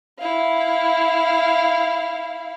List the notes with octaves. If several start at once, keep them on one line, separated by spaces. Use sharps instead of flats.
E4 F5